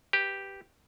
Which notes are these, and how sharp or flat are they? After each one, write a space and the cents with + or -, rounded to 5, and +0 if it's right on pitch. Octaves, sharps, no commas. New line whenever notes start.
G4 +0 B4 +0